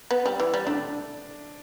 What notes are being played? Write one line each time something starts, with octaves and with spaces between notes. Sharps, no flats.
B3
G3
E3
G3
A3 D4